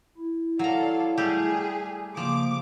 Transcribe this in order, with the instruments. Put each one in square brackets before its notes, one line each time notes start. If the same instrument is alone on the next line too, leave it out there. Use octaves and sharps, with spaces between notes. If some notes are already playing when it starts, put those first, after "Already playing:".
[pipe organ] E4
[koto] F#3 A#5 [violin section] A4 D5 F5
[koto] G3 A3 G4 [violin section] G#4
[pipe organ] C#3 A#3 [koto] F3 [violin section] D6